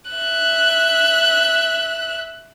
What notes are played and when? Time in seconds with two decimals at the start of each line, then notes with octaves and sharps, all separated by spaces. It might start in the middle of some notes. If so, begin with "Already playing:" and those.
0.11 E5 F#6